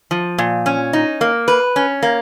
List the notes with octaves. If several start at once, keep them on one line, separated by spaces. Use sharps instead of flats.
F3
A#2
C#4
D#4
A#3
B4
C#4
A#3